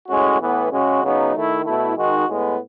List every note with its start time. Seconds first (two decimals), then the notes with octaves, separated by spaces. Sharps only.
0.08 A2 G#3 C#4 F#4
0.41 A2 E3 B3
0.71 C#3 G#3 C#4 F#4
1.02 C#3 F#3 B3 D#4
1.34 D#3 A3 E4
1.65 B2 A3 E4
1.96 D#3 G#3 D#4 F#4
2.26 A2 G#3 B3